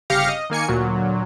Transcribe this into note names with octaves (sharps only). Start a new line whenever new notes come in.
G1 C#3 G4 F5 A#6 C#7
D#5
D#3 A#3 G#5 C#7
D2 A#2 F#3